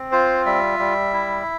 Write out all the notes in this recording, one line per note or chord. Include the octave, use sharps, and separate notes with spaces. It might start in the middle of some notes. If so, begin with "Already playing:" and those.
Already playing: C4
F4 C5
G3 E5
G3
E4